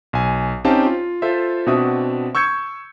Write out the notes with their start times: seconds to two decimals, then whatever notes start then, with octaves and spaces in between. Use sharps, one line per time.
0.13 B1 G#5
0.64 C4 C#4 D#4 G4 F5 A5
0.86 F4
1.22 F4 A4 C5 E5
1.67 B2 C4 D4 F#4 E5 D#6
2.35 C#6 E6 G6 G#6 C#7